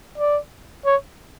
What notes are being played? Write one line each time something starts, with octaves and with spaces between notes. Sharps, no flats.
D5
C#5